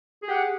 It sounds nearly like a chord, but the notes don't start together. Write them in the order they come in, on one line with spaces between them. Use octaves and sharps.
G#4 G4 F#5